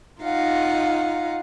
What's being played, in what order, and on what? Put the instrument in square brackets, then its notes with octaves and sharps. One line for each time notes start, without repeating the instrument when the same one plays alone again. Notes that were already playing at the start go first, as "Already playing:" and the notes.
[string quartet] D#4 F4 F5 F#5